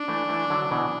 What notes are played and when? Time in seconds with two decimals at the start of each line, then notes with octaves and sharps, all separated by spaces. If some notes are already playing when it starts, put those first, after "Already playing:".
Already playing: D4
0.08 E3 A3
0.29 E3 A3
0.50 D3 F#3
0.71 B2 E3